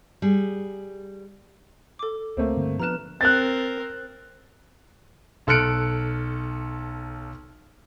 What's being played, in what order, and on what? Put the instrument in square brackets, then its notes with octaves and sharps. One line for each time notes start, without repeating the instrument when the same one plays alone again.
[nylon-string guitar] G3 G#4
[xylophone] A4 D6
[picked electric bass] C#2 [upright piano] A3 A#3 C4
[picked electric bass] G2 D3
[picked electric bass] F3 A#3 D4 [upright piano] B3 E7 [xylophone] A#5 F6 F#6
[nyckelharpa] C4 A#4 [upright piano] F#6 A6
[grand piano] B1 A4 F6 F#6 C#7 D7